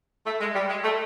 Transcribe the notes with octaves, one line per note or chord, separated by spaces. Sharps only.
A3
G#3
G3
G#3
A3